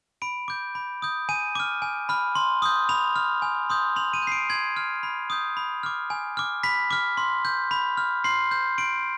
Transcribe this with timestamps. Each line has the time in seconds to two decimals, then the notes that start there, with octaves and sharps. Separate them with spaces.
0.22 B5 D7
0.48 D6 G6
0.75 B5
1.02 D#6 G6
1.29 G#5 D#7
1.55 D6 F6
1.82 G#5
2.09 B5 F6
2.35 C6
2.62 D#6 G6
2.89 B5 F7
3.16 F6
3.42 G#5
3.70 C6 D#6 G6
3.96 C6 F7
4.13 D#7
4.22 G6 C7
4.32 D7
4.49 C6 G#6
4.77 F6
5.03 B5
5.30 D#6 G6
5.57 B5
5.83 D6 F6
6.10 G#5
6.37 D6 F6
6.63 B5 B6
6.90 D6 F6
7.17 C6
7.45 G6
7.71 B5
7.97 F6
8.24 C6 C7
8.51 G6
8.78 C6 D7